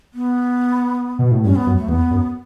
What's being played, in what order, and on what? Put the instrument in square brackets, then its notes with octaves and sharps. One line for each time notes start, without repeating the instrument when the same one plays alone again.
[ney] B3
[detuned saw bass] B2
A2
[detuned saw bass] G2 [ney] C#4
[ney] B3
[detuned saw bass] F#2
[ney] A3
[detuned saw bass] E2 [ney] B3
[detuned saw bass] F#2